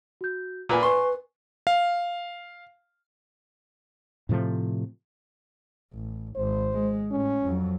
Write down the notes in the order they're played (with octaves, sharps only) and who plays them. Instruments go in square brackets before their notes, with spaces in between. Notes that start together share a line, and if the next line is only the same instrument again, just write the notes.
[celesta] F#4 G6
[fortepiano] A#2 B4 G#5
[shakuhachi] B4 [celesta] G#5 C#6 [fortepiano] C6
[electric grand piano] F5
[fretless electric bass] A2 C3 F3 A3
[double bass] A1
[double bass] G#1 [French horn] C5
[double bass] G#3
[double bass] A2 [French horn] C#4
[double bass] F2 F#3